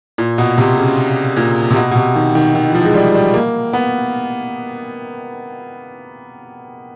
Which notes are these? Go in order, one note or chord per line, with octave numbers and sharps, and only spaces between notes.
A#2
B2
C3
C#3
A#2
C3
B2
B2
C3
D#3
D#3
D#3
E3
F3
G#3
G3
G3
A#3
B3